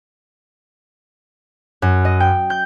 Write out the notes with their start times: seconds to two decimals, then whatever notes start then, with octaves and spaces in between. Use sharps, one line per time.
1.82 F#2
2.05 D#5
2.20 G5
2.50 G6